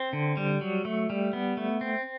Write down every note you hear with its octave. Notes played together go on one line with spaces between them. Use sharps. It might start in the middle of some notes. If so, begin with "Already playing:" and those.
Already playing: C4
D3
G3
F#3
A3
G3
B3
A3
C4